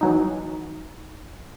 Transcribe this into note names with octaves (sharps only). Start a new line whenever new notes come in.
E3 F#3 D#4